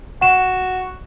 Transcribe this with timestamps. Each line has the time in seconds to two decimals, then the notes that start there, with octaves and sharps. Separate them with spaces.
0.22 F#4 F#5 E7